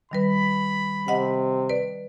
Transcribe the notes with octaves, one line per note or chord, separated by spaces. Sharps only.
D#3 G3 B4 B5
C3 D#5 F#5
B4 D5